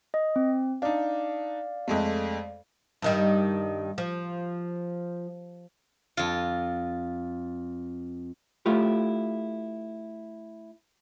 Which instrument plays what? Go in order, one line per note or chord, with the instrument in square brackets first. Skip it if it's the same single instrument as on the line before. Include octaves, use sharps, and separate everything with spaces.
[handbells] D#5
C4
[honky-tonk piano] D4 D#4 [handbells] D5 F5
[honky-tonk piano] F2 G#3 A3
[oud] G2 D#3 G3
F3
[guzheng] F2 F4
[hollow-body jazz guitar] A3 E4 F4 G4